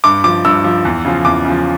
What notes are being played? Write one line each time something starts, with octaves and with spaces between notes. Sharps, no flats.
G2 D6
F3 D6
G2 E6
F3
E2
C#3 F3
E2 D6
C#3 F3